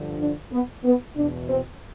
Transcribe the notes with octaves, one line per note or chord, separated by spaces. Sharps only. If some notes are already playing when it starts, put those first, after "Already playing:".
Already playing: G2 D3 F3
D4
B3
B3
E2 B2 D4
C4